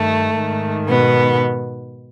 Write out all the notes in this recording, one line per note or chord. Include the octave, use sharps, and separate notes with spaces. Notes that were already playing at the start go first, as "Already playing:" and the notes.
Already playing: G2 D#3 A3
G#2 D#3
B2 B3